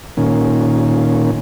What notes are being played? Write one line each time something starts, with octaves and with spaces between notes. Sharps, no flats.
A#2 D#3 C#4